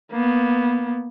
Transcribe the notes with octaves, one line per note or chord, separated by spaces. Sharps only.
A#3 B3